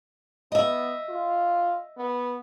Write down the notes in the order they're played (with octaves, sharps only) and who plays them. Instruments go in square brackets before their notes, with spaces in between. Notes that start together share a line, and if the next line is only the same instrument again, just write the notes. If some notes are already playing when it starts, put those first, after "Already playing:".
[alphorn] B3 [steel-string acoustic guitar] D#5 E5
[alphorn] F4
B3